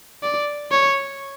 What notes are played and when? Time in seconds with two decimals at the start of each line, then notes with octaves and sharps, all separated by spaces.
0.23 D5
0.71 C#5